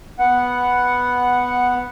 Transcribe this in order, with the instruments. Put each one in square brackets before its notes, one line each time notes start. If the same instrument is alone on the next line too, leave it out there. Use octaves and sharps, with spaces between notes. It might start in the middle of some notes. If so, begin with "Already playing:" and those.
[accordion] B3 F#5